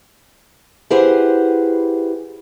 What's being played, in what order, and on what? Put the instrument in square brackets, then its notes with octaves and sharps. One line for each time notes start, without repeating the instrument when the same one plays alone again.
[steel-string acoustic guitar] E4 G4 G#4 B4 C5 F#5